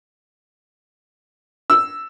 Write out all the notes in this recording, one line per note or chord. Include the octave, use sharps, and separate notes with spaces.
E6